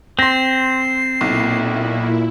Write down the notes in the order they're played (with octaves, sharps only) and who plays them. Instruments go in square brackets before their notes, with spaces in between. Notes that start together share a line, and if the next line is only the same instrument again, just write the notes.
[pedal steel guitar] C4 [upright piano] C6 A#6 [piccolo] C7
[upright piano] B1 [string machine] A#2 E4